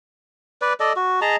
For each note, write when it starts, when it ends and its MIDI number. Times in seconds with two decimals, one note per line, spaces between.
0.62 0.73 71
0.62 0.73 74
0.80 0.93 69
0.80 0.93 74
0.80 0.93 75
0.96 1.20 66
1.21 1.36 68
1.21 1.36 75
1.21 1.36 81
1.21 1.36 82